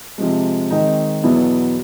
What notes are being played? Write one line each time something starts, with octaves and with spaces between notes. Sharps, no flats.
C3 F3 G#3
D#3 G#3 C4 D#4
E2 B2 F#3 B3 E4